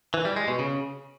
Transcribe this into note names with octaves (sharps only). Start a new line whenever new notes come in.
E3
G3
G#3
B2
C#3